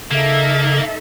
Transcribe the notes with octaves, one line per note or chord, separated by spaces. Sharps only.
C#3 A#3 D#4 A4 E5